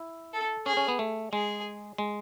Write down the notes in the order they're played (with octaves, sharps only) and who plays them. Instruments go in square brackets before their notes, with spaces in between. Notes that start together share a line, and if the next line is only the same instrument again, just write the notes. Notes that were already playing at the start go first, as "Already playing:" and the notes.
Already playing: [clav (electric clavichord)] E4
[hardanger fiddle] A4
[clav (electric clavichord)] C#4 [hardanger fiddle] G#4
[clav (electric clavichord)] C#4
B3
A3
[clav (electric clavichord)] G#3 [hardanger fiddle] G#4
[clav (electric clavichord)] G#3